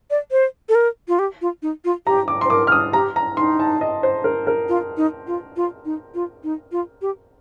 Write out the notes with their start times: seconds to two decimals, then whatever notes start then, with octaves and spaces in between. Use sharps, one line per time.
0.10 D5
0.31 C5
0.69 A4
0.75 A#4
1.08 F4
1.19 G4
1.42 F4
1.62 D#4
1.85 F4
2.07 G4 A#5
2.28 D6
2.41 C5 C6
2.50 A#4 D6
2.67 F6
2.72 D#6
2.93 G4 A#5
3.16 A#5
3.37 D#4 C6
3.60 A5
3.81 D#5
4.03 C5
4.24 A#4
4.47 A#4
4.69 F4
4.97 D#4
5.27 F4
5.56 F4
5.85 D#4
6.15 F4
6.44 D#4
6.72 F4
7.02 G4